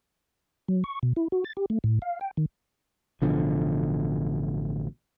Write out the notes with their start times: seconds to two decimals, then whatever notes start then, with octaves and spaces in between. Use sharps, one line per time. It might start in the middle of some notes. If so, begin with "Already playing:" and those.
0.68 F#3
0.84 C#6
1.03 B2
1.16 E4
1.32 F#4
1.44 A6
1.57 G4
1.70 A3
1.84 A2
2.02 F5
2.21 G5
2.37 D#3
3.22 A1 B2 D3 F3